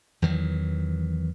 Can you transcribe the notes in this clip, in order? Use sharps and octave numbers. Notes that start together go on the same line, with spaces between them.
E2 D#3 E3 F#3